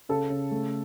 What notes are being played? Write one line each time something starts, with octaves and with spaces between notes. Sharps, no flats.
C#3 A4
C#3
A3